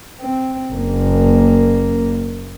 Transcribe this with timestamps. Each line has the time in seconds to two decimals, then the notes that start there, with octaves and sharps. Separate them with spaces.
0.20 C4
0.73 F#1 A#3